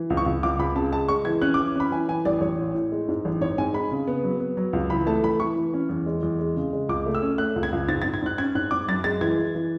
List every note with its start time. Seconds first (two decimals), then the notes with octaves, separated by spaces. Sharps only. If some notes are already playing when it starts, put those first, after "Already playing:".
Already playing: E3
0.10 C#2
0.17 C#6
0.26 C#2
0.43 C#2 D6
0.59 C#2 B5
0.75 C#3 A5
0.92 G#3 A5
1.08 G#3 C#6
1.25 E3 G#6
1.41 C#4 F#6
1.54 D6
1.58 E3
1.76 C#4 B5
1.91 E3 G#5
2.08 E3 G#5
2.25 A1 D5
2.41 A1 C#5
2.58 A2
2.75 A2
2.92 G#3
3.08 G#2
3.25 A1
3.41 G#2 C#5
3.58 G#2 G#5
3.74 G#3 B5
3.91 C#3
4.07 B3
4.24 F#3
4.40 B3
4.57 F#3
4.73 C#2
4.90 E3 B5
5.07 A3 A5
5.23 E3 B5
5.40 E3 C#6
5.56 E3
5.74 C#4
5.89 E2
6.06 G#3
6.23 E2
6.39 G#3
6.56 C#3
6.73 G#3
6.89 C#2 D6
7.06 A3
7.15 E6
7.22 C#4
7.38 A3 F#6
7.56 C#2
7.63 G#6
7.72 C#2
7.88 G#2 A6
8.02 A6
8.05 G#2
8.14 G#6
8.22 G#2 F#6
8.38 C#4 G#6
8.55 G#2 F#6
8.71 G#2 D6
8.88 F#2 A6
9.04 G#3 A6
9.21 E3 G#6
9.38 E3
9.55 E3